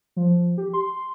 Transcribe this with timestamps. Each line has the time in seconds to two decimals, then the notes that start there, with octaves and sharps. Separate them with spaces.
0.16 F3
0.58 G4
0.73 C6